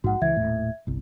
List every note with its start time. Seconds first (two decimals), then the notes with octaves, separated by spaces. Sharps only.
0.04 A#1 G#2 F#4 F#5
0.22 C#2 C#3 E3 E5 G#6
0.36 D#1 A2
0.87 G1 C2